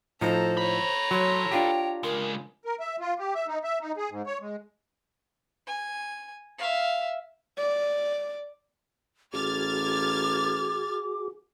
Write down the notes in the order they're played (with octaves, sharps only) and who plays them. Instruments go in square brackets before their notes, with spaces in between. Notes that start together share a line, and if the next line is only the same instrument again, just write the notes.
[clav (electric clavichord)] A2 F3 D#4 [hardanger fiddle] A4 A#5 [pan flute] C5
[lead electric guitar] A4 B5 [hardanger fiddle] C#5 A#5
[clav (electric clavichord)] F#3 [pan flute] C6
[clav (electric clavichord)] D4 F4 G4 [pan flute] G5
[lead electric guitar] C#3 G#3 [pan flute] A#4
[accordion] A#4
E5
F4
G4
E5
D#4
E5
D#4
G#4
G#2
C#5
G#3
[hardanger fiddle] G#5
E5 F5
[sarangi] D5
[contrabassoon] A1 [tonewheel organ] F#4 G#4 [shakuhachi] D6 [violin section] F6 G#6 A6